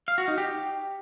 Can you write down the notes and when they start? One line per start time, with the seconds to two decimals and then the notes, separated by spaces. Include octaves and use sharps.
0.08 F5
0.18 F#4
0.28 D#4
0.38 G4